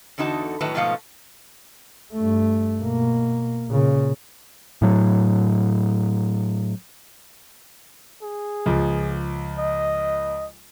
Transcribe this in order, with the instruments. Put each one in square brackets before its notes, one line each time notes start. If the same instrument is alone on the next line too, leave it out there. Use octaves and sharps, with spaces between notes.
[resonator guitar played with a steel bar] E2 D3 D#4 F#4 A5
A2 D#3 F#3 B4 A5
G#2 B2 F3 A3 B3 F5
[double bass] G2 A3
B2 A#3
A#2 C#3
[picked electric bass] A2 F#3
[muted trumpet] G#4
[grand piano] C#2 F3
[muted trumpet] D#5